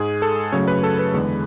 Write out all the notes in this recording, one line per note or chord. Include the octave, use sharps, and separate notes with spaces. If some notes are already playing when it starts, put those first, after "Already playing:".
Already playing: G#2 G#3 G#4
A4
F#2 C#3 F#3 A3 C#5
B4
A4
B4
E2 D3 G#3